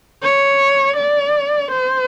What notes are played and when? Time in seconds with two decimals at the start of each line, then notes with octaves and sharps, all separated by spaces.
0.23 C#5
0.97 D5
1.72 C5